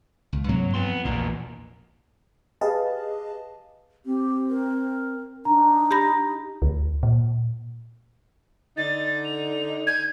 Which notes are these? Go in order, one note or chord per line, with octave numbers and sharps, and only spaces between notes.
C#2
G2 C3 F#3 A#3
F2 B3 C6
A#1 E2 B2 A#3
G4 G#4 B4 D#5 F5 A5
C4 G4
A#4
D4 D#4 A#5
G4 B5 A#6
D2
A#2
D3 D#4 A6
F7
G6 G#6